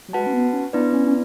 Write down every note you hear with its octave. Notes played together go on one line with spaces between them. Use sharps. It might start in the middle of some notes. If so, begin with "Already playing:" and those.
F#3
G#3 F#4 B4 F#5 A5
C#4
B3
C#4
B3 D4 E4 B4 D5
C#4
C#4